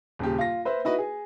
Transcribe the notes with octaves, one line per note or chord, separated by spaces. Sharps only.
D#1 C#3 G4
F4 A#6
B4 C5 E5
D#4 E4 F#4 B4 D#5
G#4